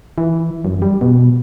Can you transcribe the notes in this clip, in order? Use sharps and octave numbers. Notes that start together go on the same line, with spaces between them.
E3
F#2
G3
B2